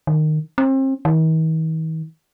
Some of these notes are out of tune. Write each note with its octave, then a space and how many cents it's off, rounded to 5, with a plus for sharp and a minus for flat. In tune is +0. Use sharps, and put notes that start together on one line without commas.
D#3 -15
C4 +35
D#3 +45